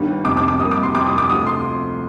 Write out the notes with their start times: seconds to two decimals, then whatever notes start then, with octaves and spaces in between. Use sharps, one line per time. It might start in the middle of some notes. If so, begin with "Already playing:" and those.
Already playing: G1 G2 D#3 G3
0.25 F1 F2 C3 D6
0.37 D6
0.48 D6
0.60 C2 C3 G3 A#3 D#6
0.71 D6
0.83 C6
0.94 F2 C3 G3 D6
1.07 D#6
1.18 D6
1.29 D2 C3 F3 A3 D#6
1.47 C6